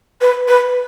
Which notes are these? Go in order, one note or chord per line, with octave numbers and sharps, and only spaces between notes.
B4
B4